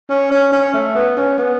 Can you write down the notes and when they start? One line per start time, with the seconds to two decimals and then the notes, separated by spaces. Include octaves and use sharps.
0.10 C#4
0.31 C#4
0.52 C#4
0.74 A3
0.95 B3
1.17 C#4
1.38 B3